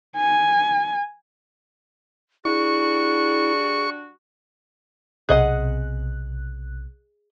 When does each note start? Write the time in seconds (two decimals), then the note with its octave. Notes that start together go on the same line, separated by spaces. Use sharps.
0.17 G#5
2.45 G3 D4 E4 F#4 G#4 C#6
5.29 B1 C3 G#4 D#5 F#5 F#6